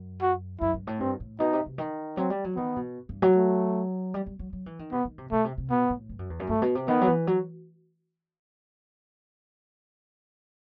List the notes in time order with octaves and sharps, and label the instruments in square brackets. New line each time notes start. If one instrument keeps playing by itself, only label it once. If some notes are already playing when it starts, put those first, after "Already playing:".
Already playing: [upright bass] F#2
[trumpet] F#4
[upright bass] F#2 [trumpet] E4
[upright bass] G2
A2
[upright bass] G2 [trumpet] C4
[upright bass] A2
[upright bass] B2 [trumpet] D#4
[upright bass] C3
C3
D#3
[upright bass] F#3 [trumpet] C4
[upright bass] G3
F#3
[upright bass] D#3 [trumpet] B3
[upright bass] B2
G2
F#3
[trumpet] A3
[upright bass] G3
G3
F#3
F#3
E3
D#3
[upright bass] C3 [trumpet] B3
[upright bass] D#3
C3
[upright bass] B2 [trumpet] A3
[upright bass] C3
C3
[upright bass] B2 [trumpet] B3
[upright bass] A2
G2
F#2
E2
F#2
[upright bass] G2 [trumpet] A3
[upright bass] B2
C3
[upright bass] D#3 [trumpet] B3
[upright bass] F#3
E3
F#3